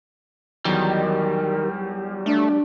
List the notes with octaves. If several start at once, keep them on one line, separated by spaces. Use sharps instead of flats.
E2 D#3 F#3 G3
A3 D4